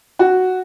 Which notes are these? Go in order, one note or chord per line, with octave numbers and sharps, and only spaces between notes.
F#4